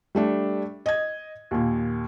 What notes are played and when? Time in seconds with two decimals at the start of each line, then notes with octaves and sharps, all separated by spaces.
0.15 G3 A3 D4
0.86 D#5 G#6
1.51 D#2 A#2